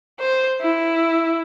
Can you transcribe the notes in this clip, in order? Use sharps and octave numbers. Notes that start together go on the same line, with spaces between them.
C5
E4